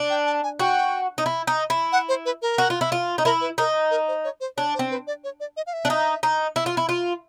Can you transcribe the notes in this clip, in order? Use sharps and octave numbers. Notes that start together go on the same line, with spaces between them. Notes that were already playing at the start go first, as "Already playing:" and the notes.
Already playing: D4
G5
A5
G#5
F#4 G5
D#4
E4
D#4
E4
F#5
C5
B4
A#4
F#4
F4
E4
F4
D#4
E4 A#4
B4
D#4 A#4
A#4
C5
C#5
C5
D4 C#5
C5
C4
B4
D5
C#5
D5
D#5
F5
E5
D4
D#4
D#4
E4
F4
E4
F4